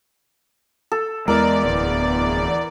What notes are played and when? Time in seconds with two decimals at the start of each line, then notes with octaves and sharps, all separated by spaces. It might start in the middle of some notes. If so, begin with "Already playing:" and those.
0.92 A4
1.28 E2 G#3 A#4 D5
1.65 D1